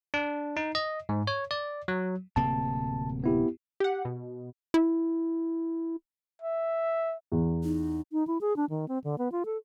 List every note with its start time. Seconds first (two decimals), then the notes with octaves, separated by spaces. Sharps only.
0.14 D4
0.57 D#4
0.75 D#5
1.09 G#2
1.27 C#5
1.51 D5
1.88 F#3
2.36 D1 C3 A#3 A5
3.24 B3 E4 G4
3.80 G4 F#5
4.05 B2
4.74 E4
6.42 E5
7.32 E2
7.64 D#4
8.12 D#4
8.27 E4
8.41 G#4
8.56 D4
8.70 D#3
8.88 C4
9.04 D3
9.18 B3
9.32 F4
9.45 A4